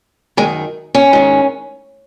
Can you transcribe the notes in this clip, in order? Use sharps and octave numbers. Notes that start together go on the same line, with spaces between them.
F#2 D#3 G#3
C#4
G#2 D#3